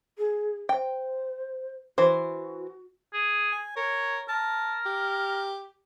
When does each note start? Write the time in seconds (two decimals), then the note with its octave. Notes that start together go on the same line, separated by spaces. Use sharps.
0.18 G#4
0.69 C5 G5
1.98 E3 F#4 C5
3.14 G#4
3.52 G#5
3.77 A#4 C#5
4.29 A#4 A5
4.86 G4